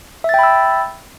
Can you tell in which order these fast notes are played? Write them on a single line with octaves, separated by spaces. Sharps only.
E5 A6 G5 B5 E6